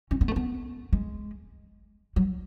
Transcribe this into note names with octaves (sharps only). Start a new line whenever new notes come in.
C#4
B3
A3
B3
G#3
F#3